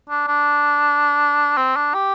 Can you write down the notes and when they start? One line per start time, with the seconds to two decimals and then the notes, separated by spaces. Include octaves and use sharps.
0.10 D4
0.28 D4
1.57 C4
1.76 D4
1.94 G4